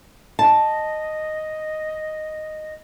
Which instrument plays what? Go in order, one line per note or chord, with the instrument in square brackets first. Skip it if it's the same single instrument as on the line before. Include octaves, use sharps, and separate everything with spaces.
[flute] D#5 [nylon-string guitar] A5